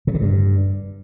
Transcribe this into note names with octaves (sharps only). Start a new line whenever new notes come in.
C3
D3
G2